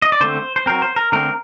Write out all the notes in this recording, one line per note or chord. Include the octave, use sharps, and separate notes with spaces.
D#5
D5
D3 A3 C4 C5
C5
F#3 C4 A#4
C5
A#4
D3 A3 C4 A#4